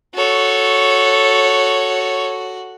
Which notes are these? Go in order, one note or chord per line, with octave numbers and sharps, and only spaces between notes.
F#4 A4 C#5